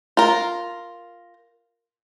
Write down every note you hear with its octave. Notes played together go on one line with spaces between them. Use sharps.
F4 A#4